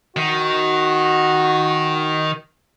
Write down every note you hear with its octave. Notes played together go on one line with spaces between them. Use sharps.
D#3 F#4